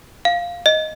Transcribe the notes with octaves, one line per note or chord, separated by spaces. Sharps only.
F5
D#5